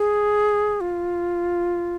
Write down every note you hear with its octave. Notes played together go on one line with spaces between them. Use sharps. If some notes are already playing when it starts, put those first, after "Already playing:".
Already playing: G#4
F4